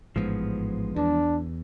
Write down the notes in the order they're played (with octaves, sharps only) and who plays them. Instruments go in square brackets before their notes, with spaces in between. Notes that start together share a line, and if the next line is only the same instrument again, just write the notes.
[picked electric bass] A1 G#2 [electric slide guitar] F3 G#3 B3
[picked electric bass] E2 [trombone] D4